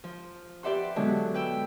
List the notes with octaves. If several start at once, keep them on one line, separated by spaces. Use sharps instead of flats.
F3
G4 B4 D5 E5 F#5 C6
B2 D3 F#3 G#3
B4 G5 E6